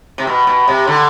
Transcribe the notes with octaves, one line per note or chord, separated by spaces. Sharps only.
C3
B2
B2
C3
D3